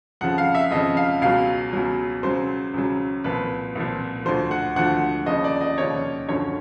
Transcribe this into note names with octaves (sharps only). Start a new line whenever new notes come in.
F2 C#3 F3 F#5
F5
E5
F2 C#3 F3 D#5
F5
C#2 B2 F#3 F5
C#2 B2 F#3
C#2 C#3 F#3 C5
C#2 C#3 F#3
C2 A#2 F3 B4
C2 A#2 F3
D2 D3 F3 C5
F#5
D2 D3 F3 F#5
D#2 C#3 F3 D#5
D5
D#5
D#2 C#3 F3 C#5
F#2 D3 F3 C#5